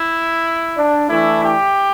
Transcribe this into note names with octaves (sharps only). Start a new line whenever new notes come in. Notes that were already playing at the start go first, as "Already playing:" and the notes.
Already playing: E4
D4
E3 A3 D4 E4
G4